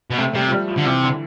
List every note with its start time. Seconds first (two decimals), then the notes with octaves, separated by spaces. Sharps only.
0.10 B2
0.18 C3 A3
0.35 C3 G3
0.48 F3
0.52 G3
0.69 F3
0.78 D3
0.87 C3 E3
1.03 D3